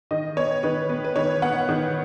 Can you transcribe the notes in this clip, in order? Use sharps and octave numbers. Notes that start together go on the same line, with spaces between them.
D#3 D#5
B3 C#5
D#3 B4
B3 B4
B4
D#3 C#5
B3 F#5
D#3